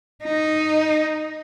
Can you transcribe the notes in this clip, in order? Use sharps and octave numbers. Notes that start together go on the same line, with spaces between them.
D#4